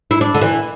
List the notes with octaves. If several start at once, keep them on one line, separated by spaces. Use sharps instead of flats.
E4
D4
D3
E3